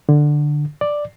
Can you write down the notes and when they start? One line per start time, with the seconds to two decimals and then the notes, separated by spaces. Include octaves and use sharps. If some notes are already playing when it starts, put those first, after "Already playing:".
0.09 D3
0.81 D5